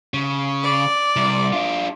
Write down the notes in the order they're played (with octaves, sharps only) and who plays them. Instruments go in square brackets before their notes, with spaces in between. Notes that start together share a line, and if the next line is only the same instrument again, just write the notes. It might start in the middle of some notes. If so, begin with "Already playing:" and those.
[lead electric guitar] C#3
[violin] D5
[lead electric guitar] C2
D4 F4